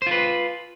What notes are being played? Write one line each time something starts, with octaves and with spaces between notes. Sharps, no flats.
F4 B4 C5